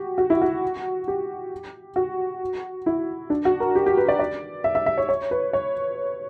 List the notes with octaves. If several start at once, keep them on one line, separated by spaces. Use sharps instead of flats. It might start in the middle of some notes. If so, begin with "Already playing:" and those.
Already playing: F#4 G4
F#4
E4
F#4
G4
F#4
E4
D4
F#4
A#4
G4
G4
B4
D5
D5
E5
E5
E5
C#5
C#5
B4
C#5